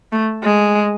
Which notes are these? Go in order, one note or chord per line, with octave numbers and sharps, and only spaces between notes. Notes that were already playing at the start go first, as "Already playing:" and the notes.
A3
G#3